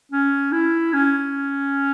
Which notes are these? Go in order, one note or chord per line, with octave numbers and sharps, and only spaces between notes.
C#4
E4
C#4